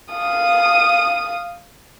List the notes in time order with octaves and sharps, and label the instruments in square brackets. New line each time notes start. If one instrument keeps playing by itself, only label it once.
[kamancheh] F5 D#6